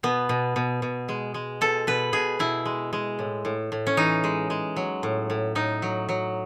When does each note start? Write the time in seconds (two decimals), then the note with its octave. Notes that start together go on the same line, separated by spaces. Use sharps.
0.03 B2 B3
0.29 B2
0.56 B2
0.82 B2
1.09 G#3
1.34 G#3
1.61 B2 A4
1.87 B2 B4
2.13 B2 G#4
2.39 B2 E4
2.65 G#3
2.93 G#3
3.19 A2
3.45 A2
3.72 A2
3.87 C#4
3.97 E3 D#4
4.24 G#3
4.50 G#3
4.76 F#3
5.03 A2
5.30 A2
5.55 A2 D#4
5.82 F#3
6.09 F#3